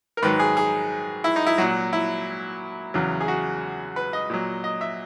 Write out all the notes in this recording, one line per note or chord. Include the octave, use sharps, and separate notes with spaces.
A#4
G#2 D#3 F#3 B4
G#4
G#4
E4
D#4
E4
A#2 F#3 F#4
E4
E2 C#3 F#3
G#4
F#4
B4
D#5
A#2 F#3
D#5
E5